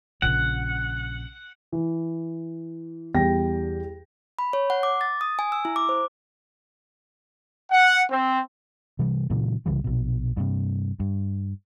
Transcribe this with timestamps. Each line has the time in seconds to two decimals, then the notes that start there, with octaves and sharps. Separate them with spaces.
0.22 A#1 C#3 F#5
1.72 E3
3.14 E2 G3 G4 G5 A#6
4.39 B5
4.53 C#5
4.70 F#5
4.83 D6
5.01 A6
5.21 D#6
5.39 G#5
5.52 E6
5.65 E4
5.76 D6
5.89 C5
7.71 F#5
8.11 C4
8.99 C3 E3 G3
9.30 A#2 C#3 E3 F#3
9.66 C2 C#3 E3 G3
9.84 A#1 B2
10.37 G2 C3
11.00 G2